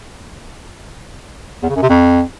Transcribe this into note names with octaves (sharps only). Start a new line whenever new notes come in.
E2
C#3
F#2
C3
F2